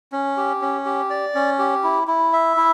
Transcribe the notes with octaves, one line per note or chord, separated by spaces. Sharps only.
C#4
G4
C#4
G4
D5
C#4
G4
E4
E4
E5
E4